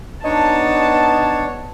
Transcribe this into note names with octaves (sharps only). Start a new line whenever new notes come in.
B3 D4 D#4 C#5 A5